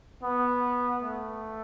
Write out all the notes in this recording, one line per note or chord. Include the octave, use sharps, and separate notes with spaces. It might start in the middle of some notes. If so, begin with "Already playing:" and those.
B3
A3